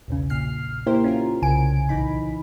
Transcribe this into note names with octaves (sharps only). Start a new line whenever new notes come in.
B1 E2 C#3
A#1 A#2 F6 C7
A#3 E4 G4 A#4 C5
C#4 F4 A#4
C2 C#3 G#5 D7
A#1 E3 D#4 B5